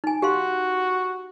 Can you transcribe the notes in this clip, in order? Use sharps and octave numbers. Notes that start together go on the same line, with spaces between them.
D#4 G#5
F#4 G4 F5 C6